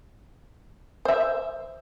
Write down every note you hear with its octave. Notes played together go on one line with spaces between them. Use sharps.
C5 E5